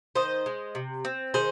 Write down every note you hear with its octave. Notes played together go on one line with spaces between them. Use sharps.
D#3 C5 D#5
G#3
C3
C4
D#3 G#4 C5